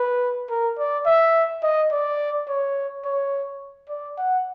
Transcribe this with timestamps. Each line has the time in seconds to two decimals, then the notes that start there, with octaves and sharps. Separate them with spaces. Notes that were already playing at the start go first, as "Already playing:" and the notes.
Already playing: B4
0.50 A#4
0.78 D5
1.06 E5
1.63 D#5
1.92 D5
2.48 C#5
3.05 C#5
3.89 D5
4.18 F#5